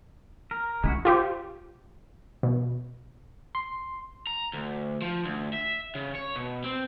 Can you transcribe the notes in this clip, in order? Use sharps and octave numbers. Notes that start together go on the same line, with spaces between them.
A#4
C#3 G#3 E4 F#4
F4 G4 C5
B2
C6
A#5
D2
F3
D2
E5
C#3
C#5
B2
C4